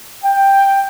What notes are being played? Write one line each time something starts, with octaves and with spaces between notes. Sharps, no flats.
G5